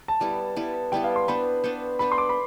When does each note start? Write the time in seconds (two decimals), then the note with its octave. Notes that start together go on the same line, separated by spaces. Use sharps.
0.08 A5
0.20 G3 B3 E4 A4
0.56 G3 B3 E4 A4
0.92 G3 B3 E4 A4 G5
1.04 F5
1.16 C6
1.28 B3 D4 A4 C5 B5
1.64 B3 D4 A4 C5
1.99 B3 D4 A4 C5 B5
2.12 C6
2.18 D6
2.29 B5